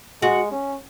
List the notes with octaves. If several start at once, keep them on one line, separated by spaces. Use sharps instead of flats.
G#3 F#4
C#4